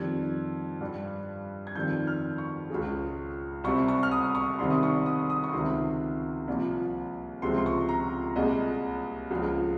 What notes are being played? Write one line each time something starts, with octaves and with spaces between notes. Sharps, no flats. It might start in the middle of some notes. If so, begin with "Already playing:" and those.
Already playing: F2 D#3 G3 G#6
G2 G3
G#6
F2 D#3 G3 G6
F6
C#6
C#2 C#3 G#3
C2 C3 G3 C#6
C#6
F6
D#6
C#6
C2 C3 D#3 G3 C6
D#6
C#6
D#6
D#6
C#6
C#2 C3 D#3 C6
C2 A#2 F3
C#2 C3 F3 G#3 C6
C6
C#6
A#5
C2 A#2 G#3 D#5
C#2 C#3 F3 G#3